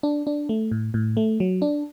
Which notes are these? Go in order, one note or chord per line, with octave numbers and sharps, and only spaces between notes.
D4
D4
A3
A2
A2
A3
F#3
D4